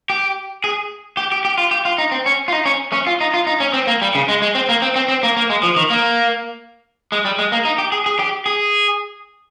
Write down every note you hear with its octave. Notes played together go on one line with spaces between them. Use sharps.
G4
G#4
G4
G4
G4
F4
G4
F4
D#4
C4
C#4
F4
D#4
C#4
C#4
F4
D#4
F4
D#4
C#4
C4
A#3
G3
C#3
G#3
G#3
C4
A#3
C4
C4
C4
A#3
A#3
G#3
F3
D#3
A#3
G#3
G3
G#3
A#3
D#4
G4
G#4
G#4
G4
G#4